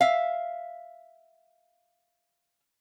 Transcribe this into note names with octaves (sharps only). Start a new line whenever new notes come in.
E5 F5